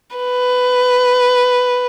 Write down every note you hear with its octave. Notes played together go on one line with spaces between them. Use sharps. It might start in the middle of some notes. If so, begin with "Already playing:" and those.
B4